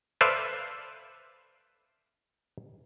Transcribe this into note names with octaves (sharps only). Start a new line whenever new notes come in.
A4 B4 C5 D5 E5 F5